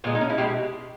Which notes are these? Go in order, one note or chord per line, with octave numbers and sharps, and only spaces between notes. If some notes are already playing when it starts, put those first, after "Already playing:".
A#2 G#3 B3
D#4
C#4
E4
B2 G#3 G4